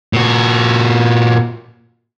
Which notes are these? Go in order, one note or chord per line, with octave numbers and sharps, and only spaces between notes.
A#2 F#4